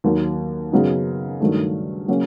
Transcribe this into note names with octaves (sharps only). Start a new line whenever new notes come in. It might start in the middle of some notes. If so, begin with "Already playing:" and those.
D#2 D#3 F#3 A#3
F#2 C#3 F#3 B3 D#4
G2 D#3 F#3 A3
C#3 F#3 A#3 C#4